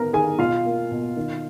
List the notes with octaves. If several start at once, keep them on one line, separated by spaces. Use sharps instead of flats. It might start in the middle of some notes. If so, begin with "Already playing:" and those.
Already playing: D#3 B3 A#4 B4 A#5
D#3 G#4 G#5
B2 F4 F5
A#3
B2
D#3